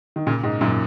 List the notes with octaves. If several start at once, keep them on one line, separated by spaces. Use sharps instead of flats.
D#3
A#2 C#3
G#2
F#2 A#2